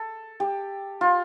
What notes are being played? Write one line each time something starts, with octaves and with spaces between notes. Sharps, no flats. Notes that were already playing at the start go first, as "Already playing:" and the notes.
Already playing: A4
G4
F4